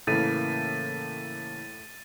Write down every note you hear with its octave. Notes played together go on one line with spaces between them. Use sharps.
A2 C#3 E3 A#3 A6 D#7